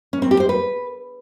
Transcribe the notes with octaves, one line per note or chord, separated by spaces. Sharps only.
C#4
C4
G4
C5
B4